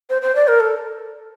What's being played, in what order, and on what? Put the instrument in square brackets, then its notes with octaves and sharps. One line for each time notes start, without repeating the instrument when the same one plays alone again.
[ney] C5
C5
D5
A#4
A4